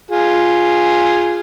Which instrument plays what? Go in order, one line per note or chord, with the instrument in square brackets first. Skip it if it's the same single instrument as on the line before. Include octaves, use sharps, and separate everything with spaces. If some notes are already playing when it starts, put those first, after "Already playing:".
[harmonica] F4 G#4